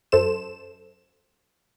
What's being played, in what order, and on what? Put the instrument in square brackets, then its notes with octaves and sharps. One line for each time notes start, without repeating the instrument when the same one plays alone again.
[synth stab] F#2 A4 C5 E7